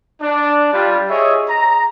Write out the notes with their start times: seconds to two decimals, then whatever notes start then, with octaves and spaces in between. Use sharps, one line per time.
0.22 D4
0.74 G3 F4
1.09 G#4 C#5 D#5 E5
1.49 A#5